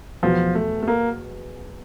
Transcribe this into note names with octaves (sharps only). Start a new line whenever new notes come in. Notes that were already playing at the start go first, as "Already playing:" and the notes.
E2 B2 F3 F#3
A3
A3
A#3